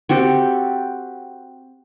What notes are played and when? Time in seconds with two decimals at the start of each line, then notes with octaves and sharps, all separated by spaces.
0.09 C4 F#4 G4 A4